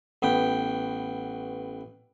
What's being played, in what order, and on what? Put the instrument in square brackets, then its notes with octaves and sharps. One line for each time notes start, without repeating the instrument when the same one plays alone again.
[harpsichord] A1 B3 G5